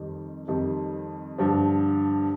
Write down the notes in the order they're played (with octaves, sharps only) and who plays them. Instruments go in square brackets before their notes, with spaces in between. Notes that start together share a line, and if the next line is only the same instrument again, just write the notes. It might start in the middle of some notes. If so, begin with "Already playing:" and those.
Already playing: [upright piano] F2 D#3 G3
F2 D#3 G3
G2 D3 F3